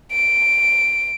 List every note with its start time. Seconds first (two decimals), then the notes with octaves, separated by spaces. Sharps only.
0.12 D7